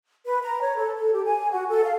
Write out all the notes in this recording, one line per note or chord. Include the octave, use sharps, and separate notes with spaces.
B4
A#5
C#5
A4
A4
G4
G#5
F#4
A4
F5